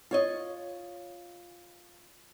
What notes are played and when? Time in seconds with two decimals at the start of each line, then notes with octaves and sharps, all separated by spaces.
0.11 F4 C#5 D#5